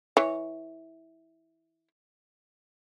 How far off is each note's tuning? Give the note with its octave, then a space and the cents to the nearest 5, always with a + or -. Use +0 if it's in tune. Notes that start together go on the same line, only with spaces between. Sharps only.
E3 -15 C#5 +0